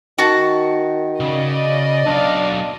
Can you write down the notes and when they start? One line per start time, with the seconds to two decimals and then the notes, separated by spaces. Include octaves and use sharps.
0.18 D#3 F#4 A5
1.20 C#3 D5 D#5
2.06 B1 D4 F5